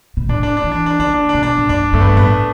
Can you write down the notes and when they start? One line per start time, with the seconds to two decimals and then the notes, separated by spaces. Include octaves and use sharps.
0.17 B2
0.29 A2 D4
0.43 D4
0.57 D4
0.64 E3
0.72 D4
0.86 D4
1.00 D3 D4
1.14 D4
1.29 D4
1.35 B2
1.43 D4
1.58 A2
1.69 G2 D4
1.93 G2 A3
2.00 B3
2.07 A3
2.17 A2 B3